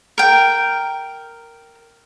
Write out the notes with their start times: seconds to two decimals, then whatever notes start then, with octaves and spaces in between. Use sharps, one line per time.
0.18 A#4 G5